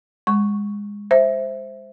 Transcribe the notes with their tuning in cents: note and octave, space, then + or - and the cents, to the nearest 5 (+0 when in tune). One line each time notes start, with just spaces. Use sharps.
G#3 -20 C#6 +0
C5 +0 E5 +0